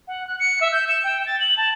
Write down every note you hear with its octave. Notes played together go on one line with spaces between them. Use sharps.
F#5
F#6
C#7
E5
G6
E7
G5
A6
F#7
A5